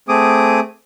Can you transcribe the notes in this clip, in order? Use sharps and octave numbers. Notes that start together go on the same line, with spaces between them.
A3 C4 G#4 D6 D#6